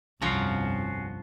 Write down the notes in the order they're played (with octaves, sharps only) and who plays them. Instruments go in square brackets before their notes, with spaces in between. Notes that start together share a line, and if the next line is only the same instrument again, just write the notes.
[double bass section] G1 [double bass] C2 F2 [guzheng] F3 A#5 [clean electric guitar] C#4 F#4 F5